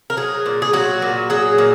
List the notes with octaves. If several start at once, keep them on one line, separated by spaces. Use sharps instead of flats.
A#4
F#3 G#4
A#2
G#4
F#3 F#4
A#2
F#3 G#4
A#2